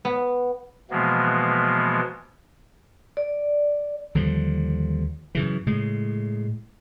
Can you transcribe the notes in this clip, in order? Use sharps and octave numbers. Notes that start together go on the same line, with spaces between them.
B3
B2 E3 F3 G#3 A#3 B3
D5
D#2 D3 F3 G3
F#2 C#3 E3
A2 C#3 G#3